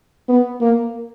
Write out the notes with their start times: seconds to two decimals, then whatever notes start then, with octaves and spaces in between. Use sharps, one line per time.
0.29 B3
0.61 A#3